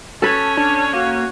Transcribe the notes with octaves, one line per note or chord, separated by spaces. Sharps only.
C#4 A4 B4 C#5 A5
D4 A5
A#3 F#4